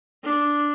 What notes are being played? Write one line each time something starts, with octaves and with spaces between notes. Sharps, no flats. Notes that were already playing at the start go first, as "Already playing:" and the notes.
D4